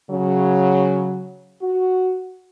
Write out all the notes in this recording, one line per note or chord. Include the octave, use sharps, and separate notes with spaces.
C#3 F#3
F#4